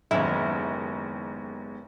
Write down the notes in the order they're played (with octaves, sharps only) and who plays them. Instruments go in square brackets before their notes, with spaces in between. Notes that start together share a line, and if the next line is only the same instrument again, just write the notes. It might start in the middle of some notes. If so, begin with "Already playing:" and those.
[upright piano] F#1 D#2 [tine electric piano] G#3 B3 D#4 [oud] E4